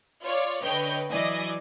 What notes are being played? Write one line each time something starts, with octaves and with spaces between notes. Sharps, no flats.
F4 C#5 D5
D3 B4 C#5 D#5 G5 G6
E3 F#3 D5 D#5 G#5